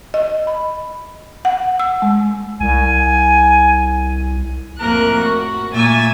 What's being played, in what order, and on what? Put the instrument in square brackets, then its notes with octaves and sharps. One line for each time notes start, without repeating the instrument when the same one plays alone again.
[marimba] D#5
B5
F#5
E6
G#3
[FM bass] C2 [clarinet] G#5
[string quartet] F2 A2 A#3 A#4 F#6
F#4
A#2 A3 A#3 G#5 E6 A6